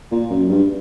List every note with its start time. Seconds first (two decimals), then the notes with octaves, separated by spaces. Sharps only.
0.11 A#2
0.30 F#2
0.49 G2